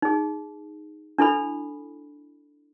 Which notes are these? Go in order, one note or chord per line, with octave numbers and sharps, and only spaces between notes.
D#4 G#4
D4 E4 A4 B5